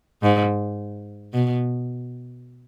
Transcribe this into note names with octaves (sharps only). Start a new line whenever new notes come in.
G#2
B2